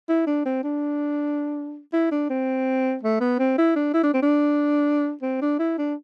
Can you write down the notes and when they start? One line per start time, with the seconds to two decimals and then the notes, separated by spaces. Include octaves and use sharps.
0.09 E4
0.27 D4
0.46 C4
0.64 D4
1.93 E4
2.12 D4
2.30 C4
3.03 A3
3.21 B3
3.39 C4
3.58 E4
3.76 D4
3.94 E4
4.03 D4
4.14 C4
4.23 D4
5.22 C4
5.42 D4
5.59 E4
5.78 D4